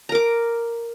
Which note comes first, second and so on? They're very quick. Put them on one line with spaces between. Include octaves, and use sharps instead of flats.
A#5 A#4 D6